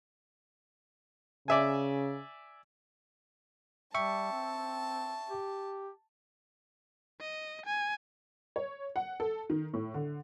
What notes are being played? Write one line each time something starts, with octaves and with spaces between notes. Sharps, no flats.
C#3 D5 E5 G#5
G3 E5 G5 A5 C#6
C4
G4
D#5
G#5
C#5
F#5
A4
D#3
A2
D3